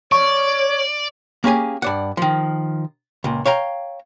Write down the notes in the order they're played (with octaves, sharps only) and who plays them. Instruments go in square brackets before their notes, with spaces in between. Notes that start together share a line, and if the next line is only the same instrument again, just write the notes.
[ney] C#5 [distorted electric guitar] D5 [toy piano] C#6
[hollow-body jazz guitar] A#3 C#4 G4 G#4 G#5
G2 D5 F#5
D#3 F3
C#2 A#2
C#5 F5 G5 A#5